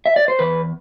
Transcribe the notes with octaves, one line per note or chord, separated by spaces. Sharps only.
E5
D5
C5
E2 B4